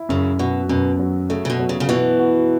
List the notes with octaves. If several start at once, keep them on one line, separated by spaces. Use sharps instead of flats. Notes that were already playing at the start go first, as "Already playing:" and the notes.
Already playing: E4
F#2 C#3
B2 F#4
F#2 B2
F#3
C#3 A3
C#3
B2
F#3
C#3
C#3
B2 E3 F#4
F#4